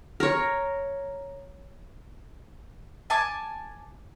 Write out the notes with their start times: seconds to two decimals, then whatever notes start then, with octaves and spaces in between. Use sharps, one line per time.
0.20 A#4 C#5
3.10 G#5 A5 D6